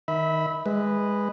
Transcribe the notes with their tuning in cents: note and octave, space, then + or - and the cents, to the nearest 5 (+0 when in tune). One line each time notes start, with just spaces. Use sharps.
D#3 +0 E5 -25 B5 +0
G#3 -15 B4 +0